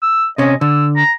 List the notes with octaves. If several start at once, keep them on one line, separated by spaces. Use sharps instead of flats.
E6
C3 C#4 D#5
D3 E6
A#5